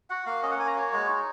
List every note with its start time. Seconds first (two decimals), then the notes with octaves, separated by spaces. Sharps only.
0.10 F#4 F#5
0.26 A#3 F5
0.43 C#4 D#5
0.51 F#5
0.59 A#3 G#5
0.67 A#5
0.76 F#4 C#5
0.93 G#3
1.09 D#4